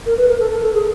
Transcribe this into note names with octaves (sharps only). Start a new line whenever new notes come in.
A#4
B4
A#4
A4
A#4
A4
G#4